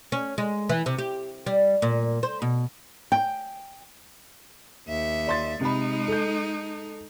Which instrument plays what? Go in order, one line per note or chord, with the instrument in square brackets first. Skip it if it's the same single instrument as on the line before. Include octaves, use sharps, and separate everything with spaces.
[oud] C#4
G#3
E3
C3
G4
G3
A#2
C5
B2
[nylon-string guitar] G5
[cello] D#2 E5
[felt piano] D5 C6 A6
[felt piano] C3 B5 [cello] G#3 D#4
[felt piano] A4 G6